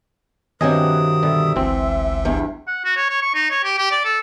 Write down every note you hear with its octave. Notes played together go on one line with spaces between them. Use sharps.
G2 C3 D#3 F#3 B4 D#5 G#5 D#6
B2 D3 G3 E5
G1 C#2 E3 C4
E2 G2
F#5
F#4
C#5
C#5
C#6
D#4
C#5
G4
G4
D5
A4